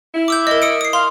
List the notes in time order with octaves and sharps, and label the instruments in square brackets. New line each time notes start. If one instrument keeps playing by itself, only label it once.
[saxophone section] E4
[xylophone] D6 E6 G6
A#4 D#5
D#6 C#7 D7
D#6 C7
[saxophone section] F5 [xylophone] C6